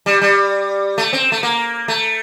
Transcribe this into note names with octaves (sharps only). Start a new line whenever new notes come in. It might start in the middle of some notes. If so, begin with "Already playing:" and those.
G3
G3
A3
C4
A3
A#3
A3